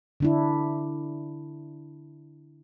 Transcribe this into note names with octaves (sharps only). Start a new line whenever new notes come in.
D3 D4 E4